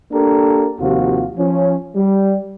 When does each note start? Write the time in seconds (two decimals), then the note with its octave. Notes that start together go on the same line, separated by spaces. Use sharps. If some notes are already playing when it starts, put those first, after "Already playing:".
0.12 A#3 D4 G4 A4 A#4
0.79 D#2 C3 F3 F4 F#4
1.37 F3 C#4
1.95 G3